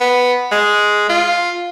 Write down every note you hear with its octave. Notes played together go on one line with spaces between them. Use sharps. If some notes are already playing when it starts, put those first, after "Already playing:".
B3
G#3
F4